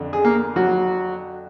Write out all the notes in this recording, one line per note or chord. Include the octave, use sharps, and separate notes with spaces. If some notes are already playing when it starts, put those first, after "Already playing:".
Already playing: F2 D3
G#4
A#3 A#4
F#3 F#4